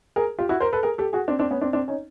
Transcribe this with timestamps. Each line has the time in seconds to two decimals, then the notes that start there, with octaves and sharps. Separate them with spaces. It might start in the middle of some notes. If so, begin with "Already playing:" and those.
0.16 G#4 A#4
0.39 F4 G4
0.49 E4 F#4
0.60 A#4 C5
0.73 A4 B4
0.83 G#4 A#4
0.98 G4 A4
1.13 F#4 G#4
1.28 C4 D4
1.39 C4 D4
1.51 B3 C#4
1.61 C4 D4
1.73 C4 D4
1.88 C#4 D#4